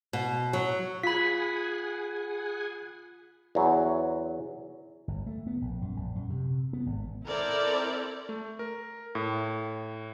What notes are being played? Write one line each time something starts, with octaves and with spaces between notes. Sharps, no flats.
B2
F#3
F4 G#4 F#5 G#5 B5 B6
E2 F#3
G1
A3
B3
A#1
F#2
A#1
F#2
C3
B3
G#1
C4 E4 A4 A#4 D5
A3
A#4
A2